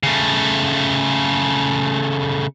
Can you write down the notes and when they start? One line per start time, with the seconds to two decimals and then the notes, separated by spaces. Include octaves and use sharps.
0.03 C#3 A3